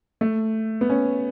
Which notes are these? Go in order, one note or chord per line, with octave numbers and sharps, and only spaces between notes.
A3
B3
C#4